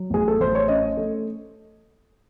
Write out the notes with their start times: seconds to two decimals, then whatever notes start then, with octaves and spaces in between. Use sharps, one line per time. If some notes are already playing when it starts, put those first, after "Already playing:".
Already playing: F#3
0.10 A1 G#4
0.28 A4
0.39 A1 C5
0.55 C#5
0.68 C#4 D#5
0.97 A3